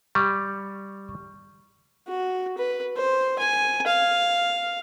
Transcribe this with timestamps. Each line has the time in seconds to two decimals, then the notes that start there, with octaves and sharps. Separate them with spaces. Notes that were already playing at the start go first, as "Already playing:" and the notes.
0.15 G3 C#6
2.08 F#4
2.58 B4
2.96 C5
3.39 G#5
3.87 F5